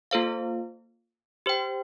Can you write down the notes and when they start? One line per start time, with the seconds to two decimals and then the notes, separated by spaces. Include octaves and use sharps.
0.11 A#3 F4 A4 C5 F5
1.46 G4 C5 G5